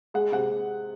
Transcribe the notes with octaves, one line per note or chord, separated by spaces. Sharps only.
G#3 F#5
C3 F#5